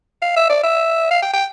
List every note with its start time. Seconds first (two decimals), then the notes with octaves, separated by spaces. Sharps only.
0.22 F5
0.36 E5
0.50 D5
0.64 E5
1.11 F5
1.22 G5
1.33 G5